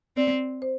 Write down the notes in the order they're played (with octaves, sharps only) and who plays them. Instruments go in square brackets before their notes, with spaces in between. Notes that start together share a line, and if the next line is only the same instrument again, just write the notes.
[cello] C4 [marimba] D5
[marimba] C5